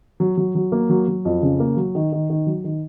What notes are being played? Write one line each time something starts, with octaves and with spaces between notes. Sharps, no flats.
F#3
F#3
F#3
A#3
F#3
F#3
F2
C#3
A#3
F#3
D#3
D#3
D#3
F#3
D#3